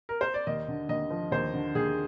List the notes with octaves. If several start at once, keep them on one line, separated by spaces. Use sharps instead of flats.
A#4
C5
D5
D#2 D#5
D3
D#2 D#5
F3
D#2 C5
D3
D#2 G#4